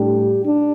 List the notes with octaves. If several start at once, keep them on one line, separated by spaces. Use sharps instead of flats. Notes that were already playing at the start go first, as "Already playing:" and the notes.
Already playing: A2 G3 D4 G4
D4